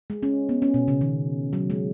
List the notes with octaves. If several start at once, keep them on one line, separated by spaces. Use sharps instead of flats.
G#3
C#4
B3
C#4
B2
C#3
D#3
F#3
G#3